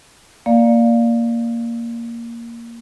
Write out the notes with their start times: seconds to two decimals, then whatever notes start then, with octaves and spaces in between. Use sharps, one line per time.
0.46 A#3 D5 F5